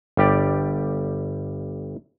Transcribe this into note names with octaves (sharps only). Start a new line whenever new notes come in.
G1 G3 G4 D5